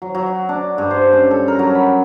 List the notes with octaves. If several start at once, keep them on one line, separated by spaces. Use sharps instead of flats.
F#3
F#3
D4
G2
C5
C#4
A4
A#4
F#3
B5